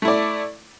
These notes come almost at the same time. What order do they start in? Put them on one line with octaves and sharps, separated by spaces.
A3 E4 D5